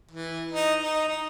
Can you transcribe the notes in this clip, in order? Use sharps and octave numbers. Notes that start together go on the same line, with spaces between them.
E3
D#4
D#4
D#4